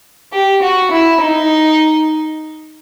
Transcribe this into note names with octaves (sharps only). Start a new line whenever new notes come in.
G4
F#4
E4
D#4